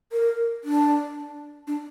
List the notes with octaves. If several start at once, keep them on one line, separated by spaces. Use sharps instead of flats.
A#4
D4
D4